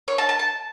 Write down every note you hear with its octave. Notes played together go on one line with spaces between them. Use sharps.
C#5
A5
A5
A5